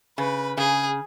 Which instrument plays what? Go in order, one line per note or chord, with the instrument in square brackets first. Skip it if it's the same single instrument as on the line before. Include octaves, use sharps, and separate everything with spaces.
[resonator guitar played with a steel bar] C#3 [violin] B4
[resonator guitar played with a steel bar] C#3 [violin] G#4